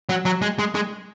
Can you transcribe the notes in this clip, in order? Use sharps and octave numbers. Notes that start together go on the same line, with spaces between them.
F#3
F#3
G#3
G#3
G#3